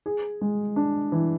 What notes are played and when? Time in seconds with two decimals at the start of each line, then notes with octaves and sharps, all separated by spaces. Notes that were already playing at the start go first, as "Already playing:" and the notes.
0.06 G#4
0.41 G#3
0.76 D4
1.12 E3